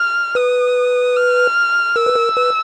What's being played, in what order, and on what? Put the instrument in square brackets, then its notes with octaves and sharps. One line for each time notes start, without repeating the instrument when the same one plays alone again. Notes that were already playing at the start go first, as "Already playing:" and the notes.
Already playing: [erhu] F6
[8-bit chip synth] B4 [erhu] D#6
[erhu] F6
[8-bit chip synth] A#4 [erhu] E6
[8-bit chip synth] B4
A#4
B4